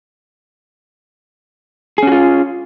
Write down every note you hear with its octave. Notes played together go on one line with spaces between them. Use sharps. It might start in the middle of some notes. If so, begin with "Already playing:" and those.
C#4 F4 F#4 G#4